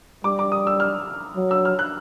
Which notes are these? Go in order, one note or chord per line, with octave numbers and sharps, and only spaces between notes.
G3 D6
D6
D#6
E6
F6
F#3
E6
F6
F#6